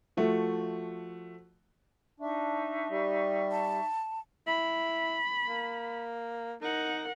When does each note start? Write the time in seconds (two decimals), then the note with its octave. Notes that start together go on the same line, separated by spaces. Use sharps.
0.17 F3 A3 F#4
2.20 D4 D#4 E5 C#6
2.90 G3
3.51 A5
4.47 E4 B5
5.48 A#3
6.62 D#4 A#4 F#5